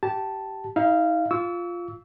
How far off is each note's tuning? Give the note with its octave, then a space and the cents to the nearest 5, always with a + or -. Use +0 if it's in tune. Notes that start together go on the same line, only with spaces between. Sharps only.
G4 -20 A5 -5
D#4 +40 F5 -15
F4 +0 C#6 +45 E6 -20